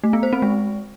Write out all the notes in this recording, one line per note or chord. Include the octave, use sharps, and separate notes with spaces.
A3
B3
C5
C4
G#3